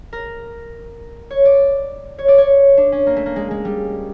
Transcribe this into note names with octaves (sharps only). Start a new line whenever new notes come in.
A#4
C#5
D5
C#5
D5
C#5
D4
C#4
A#3
A3
A#3
G#3
G#3
G3